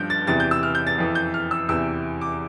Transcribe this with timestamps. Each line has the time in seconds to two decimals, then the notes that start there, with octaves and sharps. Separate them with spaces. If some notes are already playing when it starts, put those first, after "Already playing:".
Already playing: G2 F3 G6
0.10 A6
0.27 E2 C3 E3 A6
0.40 G6
0.51 E6
0.63 F6
0.75 G6
0.87 A6
0.98 F2 E3
1.15 G6
1.34 F6
1.51 E6
1.69 E2 C3 E3 E6
2.21 D6